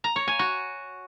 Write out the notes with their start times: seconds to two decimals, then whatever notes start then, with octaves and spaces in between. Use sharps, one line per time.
0.04 A#5
0.16 C#5
0.28 G#5
0.39 F#4